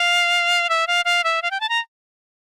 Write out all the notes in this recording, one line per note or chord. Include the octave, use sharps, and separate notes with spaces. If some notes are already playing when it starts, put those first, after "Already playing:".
Already playing: F5
E5
F5
F5
E5
F5
G5
A5
A#5